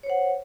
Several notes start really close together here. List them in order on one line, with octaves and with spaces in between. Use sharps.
C#5 C5 F#5